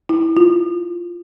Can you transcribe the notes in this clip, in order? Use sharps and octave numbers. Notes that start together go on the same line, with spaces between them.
E4
F4